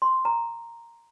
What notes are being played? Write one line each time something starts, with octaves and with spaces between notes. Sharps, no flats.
C6
A#5